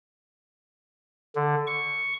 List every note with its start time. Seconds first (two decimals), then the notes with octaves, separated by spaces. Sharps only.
1.35 D3
1.67 C#6